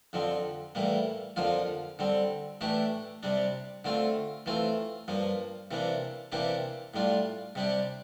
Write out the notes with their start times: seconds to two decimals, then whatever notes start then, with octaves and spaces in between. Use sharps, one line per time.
0.13 F2 D3 F3 C4
0.75 A2 E3 G3 A#3
1.36 F2 D3 F3 A#3 F4
1.99 D3 G3 C4
2.61 A2 E3 A3 D4 G4
3.23 C3 G3 D4
3.85 D3 A3 C4 F4
4.46 E3 A3 C4 F4
5.08 G2 F3 A#3
5.71 C3 E3 A#3 D4
6.32 C3 E3 A#3 D4 G4
6.94 A2 G3 D4 F4
7.55 C3 G3 D4 G4